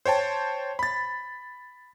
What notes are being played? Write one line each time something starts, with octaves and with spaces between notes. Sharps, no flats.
C5 C#5 G5 A5
B5 A6